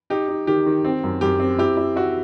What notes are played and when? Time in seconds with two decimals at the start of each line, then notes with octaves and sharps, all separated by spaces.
0.10 D#4 G4
0.28 D#4
0.47 D#3 G4
0.66 D#3
0.85 C4
1.04 F#2
1.21 F#2 G4
1.40 C4
1.58 E4 G4
1.77 E4
1.96 E4 F#4